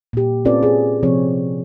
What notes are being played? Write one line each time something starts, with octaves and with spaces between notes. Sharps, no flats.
A#2 G4
C4 C#4 F4 A4 B4 D5
G#4
C3 F3 C4 C#5